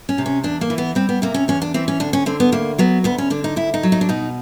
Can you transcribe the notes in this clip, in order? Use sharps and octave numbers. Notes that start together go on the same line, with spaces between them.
C#4
C3
C#4
E2 D4
A#3
E3
B3
G3 C4
B3
C3 A#3
C#4
E2 C#4
D4
E3 C4
C#4
D2 D4
C#4
D3 C4
B3
D2 A#3
F#3 B3
D2 B3
C#4
D3 D4
D#4
D2 E4
D#4
F#3
D#4
D4
B2 D#4